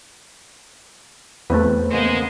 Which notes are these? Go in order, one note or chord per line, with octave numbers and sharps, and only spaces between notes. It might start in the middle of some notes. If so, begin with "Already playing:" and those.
E2 A3 C4 B4
C#3 G#3 A#3 B3 C5